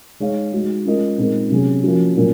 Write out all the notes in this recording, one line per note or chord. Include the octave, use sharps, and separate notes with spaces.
G#3 D#4 G#4 C#5 F5
G#3 D#4 F#4
G#3 C#4 F4 A#4 D#5
A#2 G#3 C4 D#4 A#4
C3 F#3 C#4 G#4
F3 A#3 C#4 F#4
A#2 F#3 A#3 C#4